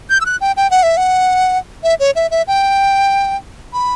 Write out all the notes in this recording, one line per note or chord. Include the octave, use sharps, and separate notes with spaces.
G6
E6
F#6
G5
G5
F#5
E5
F#5
E5
C#5
E5
E5
G5
B5